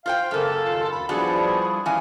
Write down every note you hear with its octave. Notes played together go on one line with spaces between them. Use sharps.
F4 C5 F5 G5
F#2 C#3 A#3 A4
D#2 F4 F5
D2 B5
F3 G3 B3 D4 E4 F#4 G#4
E3 C#4 F5 G#5